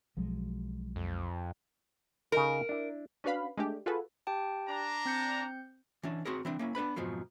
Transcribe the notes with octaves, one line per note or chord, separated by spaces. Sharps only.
B1 F3 F#3 G#3
F2
C#3 D#4 A#4 D#5
D4 E4
C#4 D4 F#4 B4 F5 B5
G#3 A3 D4 G4
F4 F#4 G#4 A4 B4
G4 G5 A5
D4 A#5
C4 G6 C#7
E3 C#4 D4
C4 F#4 G#4 A#4
E3 C4 D4
A#3 C#4 E4
B3 D4 B4 B5
F2 G#2 B2 F3 F#3